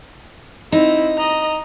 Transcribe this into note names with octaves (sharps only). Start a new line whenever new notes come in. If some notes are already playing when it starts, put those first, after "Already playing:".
C4 D#4 E4
D#5 A#5